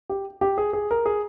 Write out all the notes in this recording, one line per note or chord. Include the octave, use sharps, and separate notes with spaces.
G4
G4
G#4
G#4
A#4
G#4